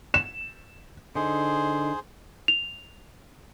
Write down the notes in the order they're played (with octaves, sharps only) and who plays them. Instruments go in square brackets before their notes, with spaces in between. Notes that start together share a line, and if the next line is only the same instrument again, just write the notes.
[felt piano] E7
[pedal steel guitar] D3 D#4 [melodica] G#4 C5
[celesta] F7